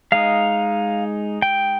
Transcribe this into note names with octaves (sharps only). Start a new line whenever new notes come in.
G#3 D#4 F5
G5